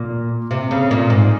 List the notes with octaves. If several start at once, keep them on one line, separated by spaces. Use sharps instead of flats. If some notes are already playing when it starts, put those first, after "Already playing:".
Already playing: A#2
C3
C#3
A#2
G#2